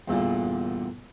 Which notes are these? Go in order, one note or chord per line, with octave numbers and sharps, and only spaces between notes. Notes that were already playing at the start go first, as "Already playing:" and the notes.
E2 G2 A#2 D3